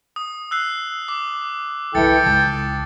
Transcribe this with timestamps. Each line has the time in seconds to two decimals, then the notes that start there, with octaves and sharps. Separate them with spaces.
0.16 D#6
0.51 E6 F#6 C7
1.08 D6
1.95 C2 E3 F3 E4 A4 G5 A6 C#7
2.26 C#2 C#4 A5